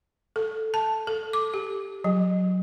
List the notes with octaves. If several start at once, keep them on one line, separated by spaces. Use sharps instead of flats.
A4
A5
A4
D6
G4
F#3